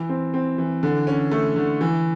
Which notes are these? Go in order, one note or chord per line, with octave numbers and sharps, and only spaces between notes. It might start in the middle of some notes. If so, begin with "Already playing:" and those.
Already playing: E3
C4
C4
E3
D3
C#4
A3
D3
E3